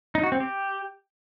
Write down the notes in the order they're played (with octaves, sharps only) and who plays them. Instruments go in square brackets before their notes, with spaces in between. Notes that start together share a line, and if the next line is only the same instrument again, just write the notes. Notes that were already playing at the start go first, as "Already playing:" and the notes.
[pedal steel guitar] D#4
F#4
C4
G4